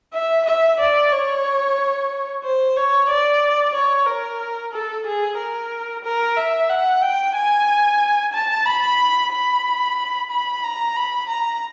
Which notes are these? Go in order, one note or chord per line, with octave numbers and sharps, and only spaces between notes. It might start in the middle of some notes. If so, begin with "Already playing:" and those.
E5
E5
D5
C#5
C5
C#5
D5
C#5
A#4
A4
G#4
A#4
A#4
E5
F#5
G5
G#5
A5
B5
B5
B5
A#5
B5
A#5